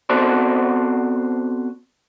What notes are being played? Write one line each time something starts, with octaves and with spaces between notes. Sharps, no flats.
B3 C4 F#4 A4 C5 D5